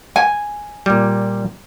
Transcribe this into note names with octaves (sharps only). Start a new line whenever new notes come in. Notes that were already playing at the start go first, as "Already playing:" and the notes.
G#5
A#2 G3